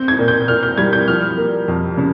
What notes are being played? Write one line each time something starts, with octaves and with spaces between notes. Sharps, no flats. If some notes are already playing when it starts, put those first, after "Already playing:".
Already playing: C4 G6
G#6
A#2
G6
A#2 F6
G6
G3 G#6
G6
F3 F6
A#3
F2
C#3